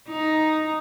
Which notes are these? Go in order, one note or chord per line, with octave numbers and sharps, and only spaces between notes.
D#4